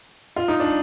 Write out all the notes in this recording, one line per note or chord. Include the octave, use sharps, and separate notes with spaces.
F4
D#4
D4